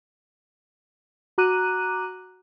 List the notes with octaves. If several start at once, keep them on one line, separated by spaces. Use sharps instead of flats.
F#4 A#5 D6 F#6 D#7